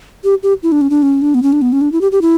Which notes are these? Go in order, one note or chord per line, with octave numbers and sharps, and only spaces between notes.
G4
G4
E4
D4
C#4
D4
C#4
D4
B3
C#4
D4
B3
C#4
D4
E4
G4
G4
E4